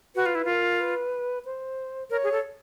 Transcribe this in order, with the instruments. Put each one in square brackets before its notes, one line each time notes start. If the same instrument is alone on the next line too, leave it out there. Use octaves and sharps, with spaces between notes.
[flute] F#4 [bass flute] B4
[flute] F4
E4
[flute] F4 [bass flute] A#4
[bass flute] B4
C5
[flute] A#4 [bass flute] C#5
[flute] G#4
A4